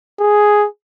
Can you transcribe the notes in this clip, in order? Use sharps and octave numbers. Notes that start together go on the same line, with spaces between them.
G#4